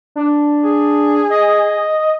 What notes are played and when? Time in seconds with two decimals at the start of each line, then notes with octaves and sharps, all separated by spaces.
0.16 D4
0.63 G#4
1.30 D#5